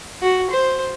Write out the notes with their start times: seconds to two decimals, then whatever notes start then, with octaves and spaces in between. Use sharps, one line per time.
0.22 F#4
0.50 C5